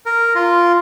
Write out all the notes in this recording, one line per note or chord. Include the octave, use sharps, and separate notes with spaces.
A#4
F4